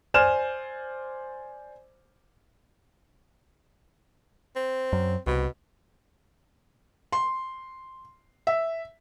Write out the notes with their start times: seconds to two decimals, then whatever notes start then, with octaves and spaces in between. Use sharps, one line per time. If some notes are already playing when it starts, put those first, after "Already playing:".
0.14 C5 D5 G#5 F6 E7
4.56 C4
4.93 F#2
5.27 C2 B2
7.12 C6
8.47 E5